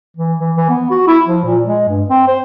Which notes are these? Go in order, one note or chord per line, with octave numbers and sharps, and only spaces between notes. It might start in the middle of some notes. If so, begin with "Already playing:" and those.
E3
E3
E3
B3
F#4
E4
F3
A#2
G#3
G2
C4
C5